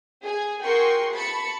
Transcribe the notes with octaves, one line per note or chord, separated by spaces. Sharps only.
G#4 G#5
F#4 G#4 A#4 G5 C6 C#6
A5 B5 C#6 A6 B6 C#7